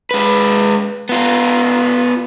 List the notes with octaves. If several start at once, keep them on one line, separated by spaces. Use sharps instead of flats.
G#3 B4
B3 F4